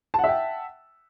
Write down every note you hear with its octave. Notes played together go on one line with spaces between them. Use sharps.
E5 F#5 G5 A5